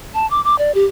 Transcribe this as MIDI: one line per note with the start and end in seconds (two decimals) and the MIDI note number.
0.14 0.29 81
0.30 0.43 86
0.44 0.58 86
0.58 0.72 74
0.75 0.86 67